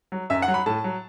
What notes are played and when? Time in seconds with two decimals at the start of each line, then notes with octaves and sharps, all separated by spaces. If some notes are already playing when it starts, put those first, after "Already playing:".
0.12 F#3
0.30 F#2 E5
0.42 F#5
0.48 F#3
0.54 B5
0.66 A2 A5
0.84 F#3